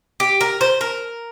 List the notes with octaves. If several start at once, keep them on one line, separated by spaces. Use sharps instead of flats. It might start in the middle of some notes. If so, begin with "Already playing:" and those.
G4
A#4
C5
A#4